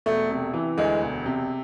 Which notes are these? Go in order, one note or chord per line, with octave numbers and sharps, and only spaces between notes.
E1 A3
C3
E3
D2 G#3
E1
C3